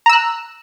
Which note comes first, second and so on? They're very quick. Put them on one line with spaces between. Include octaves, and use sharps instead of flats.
A#5 E6 F#6